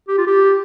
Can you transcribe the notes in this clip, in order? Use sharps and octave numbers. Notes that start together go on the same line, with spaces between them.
G4
F4
G4